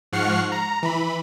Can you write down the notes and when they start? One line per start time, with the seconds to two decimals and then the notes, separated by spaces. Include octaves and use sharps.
0.13 G#2 F3 F#5 C#6 F6 C7
0.52 A#5
0.83 E3 B5